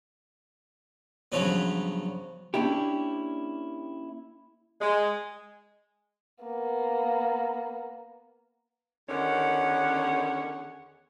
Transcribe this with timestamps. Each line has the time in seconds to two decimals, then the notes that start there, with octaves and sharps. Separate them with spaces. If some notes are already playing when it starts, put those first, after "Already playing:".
1.32 G2 C#3 F3 F#3 B3
2.54 A#3 C#4 D4 E4 G4
4.81 G#3
6.44 A#3 B3
9.09 E2 D3 D#3 C#4 F#5